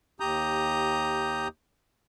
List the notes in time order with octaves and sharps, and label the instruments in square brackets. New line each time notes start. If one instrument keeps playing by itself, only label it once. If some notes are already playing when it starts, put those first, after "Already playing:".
[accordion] D#2 G4 A#5 D#6 G6